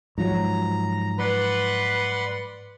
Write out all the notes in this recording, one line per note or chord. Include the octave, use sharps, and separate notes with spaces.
G#2 F3 F#3 A#5
B4 D5 F#5 C6